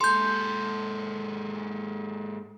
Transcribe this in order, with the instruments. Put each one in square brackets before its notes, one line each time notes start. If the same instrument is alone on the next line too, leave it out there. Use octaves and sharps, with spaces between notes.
[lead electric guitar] G#2 A4 [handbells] C6 G6